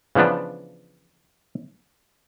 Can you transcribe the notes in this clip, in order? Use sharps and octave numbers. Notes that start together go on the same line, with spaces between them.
C#3 E3 F3 B3 D4